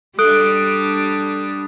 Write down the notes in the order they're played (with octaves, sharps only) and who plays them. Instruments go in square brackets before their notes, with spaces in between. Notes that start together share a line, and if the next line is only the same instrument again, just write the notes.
[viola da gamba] G3 D4 [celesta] A4 [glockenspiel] D#6 F#6 D7